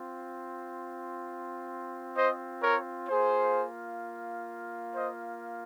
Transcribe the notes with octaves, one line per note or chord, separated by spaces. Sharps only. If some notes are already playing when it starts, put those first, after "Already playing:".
Already playing: C4 F4
C5 D#5
A#4 C#5
A#3 F4 G#4 C5
C5 D#5